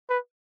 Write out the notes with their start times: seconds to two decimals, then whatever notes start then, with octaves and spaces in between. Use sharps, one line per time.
0.09 B4